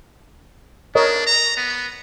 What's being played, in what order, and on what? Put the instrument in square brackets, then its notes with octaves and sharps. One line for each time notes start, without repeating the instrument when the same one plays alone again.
[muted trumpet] D4 [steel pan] A#4 C#5 D#5
[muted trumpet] A#5
B3